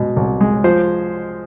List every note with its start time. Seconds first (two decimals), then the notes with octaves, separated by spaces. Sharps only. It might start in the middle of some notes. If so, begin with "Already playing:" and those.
Already playing: B2 G#3
0.16 C2
0.41 G#3
0.64 F3 C5